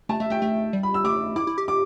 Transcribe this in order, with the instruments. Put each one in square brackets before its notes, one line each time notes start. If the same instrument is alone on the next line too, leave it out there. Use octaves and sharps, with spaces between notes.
[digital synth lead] A3 [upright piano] A5
[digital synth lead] A3 [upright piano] E5
[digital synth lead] A3 [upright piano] G5
[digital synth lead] A3
G3
[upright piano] B5
E6
[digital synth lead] A3 [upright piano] D6
[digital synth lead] E4 [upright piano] D6
[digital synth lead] E4
G4
[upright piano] D6